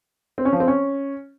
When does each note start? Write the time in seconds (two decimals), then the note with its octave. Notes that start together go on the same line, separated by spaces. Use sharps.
0.38 C4
0.45 C#4
0.53 F3
0.60 C4
0.68 C#4